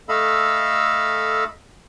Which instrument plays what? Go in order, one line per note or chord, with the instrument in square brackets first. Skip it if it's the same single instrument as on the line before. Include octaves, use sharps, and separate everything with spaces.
[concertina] A3 A4 D#5 F5 B5 E6